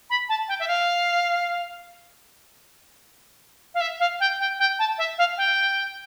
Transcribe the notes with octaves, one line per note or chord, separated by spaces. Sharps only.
B5
A5
G5
E5
F5
F5
E5
F5
G5
G5
G5
A5
E5
F5
G5